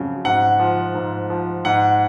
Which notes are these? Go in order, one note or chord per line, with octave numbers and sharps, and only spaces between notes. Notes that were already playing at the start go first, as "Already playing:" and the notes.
Already playing: F2 C#3 F#3
G#2 F#5
F3
G#2
F3
G#2 F#5